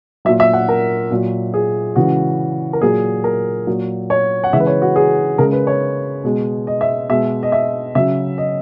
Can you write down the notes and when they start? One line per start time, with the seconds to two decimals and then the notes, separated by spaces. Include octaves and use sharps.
0.25 F#3 E5
0.28 A#2
0.40 E5
0.53 F#5
0.69 A#4
1.11 A#2 F#3
1.54 G#4
1.96 C#3 E3 G#3 F#4
2.73 A#4
2.82 A#2 F#3 G#4
3.24 A#4
3.67 A#2 F#3
4.10 C#5
4.44 F#5
4.52 C#3 E3 G#3 E5
4.60 B4
4.67 C#5
4.82 F#4
4.96 G#4
5.38 C#3 G#3 A#4
5.53 B4
5.67 C#5
6.24 B2 G#3
6.67 D#5
6.81 E5
7.09 B2 G#3 E5
7.43 D#5
7.52 E5
7.95 C#3 F#3 E5
8.38 D#5